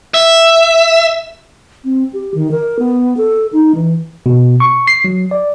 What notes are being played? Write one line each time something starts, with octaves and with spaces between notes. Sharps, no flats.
E5
C4
G4
D#3
A#4
B3
A4
D#4
E3
B2
C#6
C7
F#3
D5